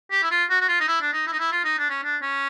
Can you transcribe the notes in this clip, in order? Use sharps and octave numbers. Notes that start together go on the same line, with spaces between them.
G4
E4
F4
F#4
F#4
F4
D#4
E4
D4
D#4
E4
D#4
E4
F4
D#4
D4
C#4
D4
C#4